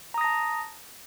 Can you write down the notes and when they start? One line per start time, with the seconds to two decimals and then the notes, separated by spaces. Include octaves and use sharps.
0.14 A#5
0.18 D#6
0.21 A#6
0.24 A5